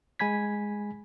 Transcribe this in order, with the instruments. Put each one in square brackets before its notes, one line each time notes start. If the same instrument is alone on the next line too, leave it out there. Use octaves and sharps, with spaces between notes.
[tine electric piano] G#3 G#5 B5 G#6 B6